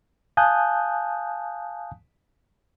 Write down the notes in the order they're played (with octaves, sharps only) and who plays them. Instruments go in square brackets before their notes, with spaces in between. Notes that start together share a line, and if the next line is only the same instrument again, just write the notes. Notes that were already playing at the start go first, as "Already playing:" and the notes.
[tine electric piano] F5 G#5 A5 D#6 F#6 G6